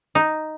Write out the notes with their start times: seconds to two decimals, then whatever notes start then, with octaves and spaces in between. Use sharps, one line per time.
0.15 D#4